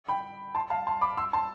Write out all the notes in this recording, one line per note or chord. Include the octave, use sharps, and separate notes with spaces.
G5 B5
A5 C6
F5 A5
A5 C6
B5 D6
C6 E6
A5 C6